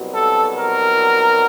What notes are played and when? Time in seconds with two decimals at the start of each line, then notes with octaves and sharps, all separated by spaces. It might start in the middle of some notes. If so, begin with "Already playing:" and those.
Already playing: C2 B2 F#3
0.14 A4
0.57 A#4